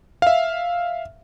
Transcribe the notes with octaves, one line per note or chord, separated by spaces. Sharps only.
E5 F5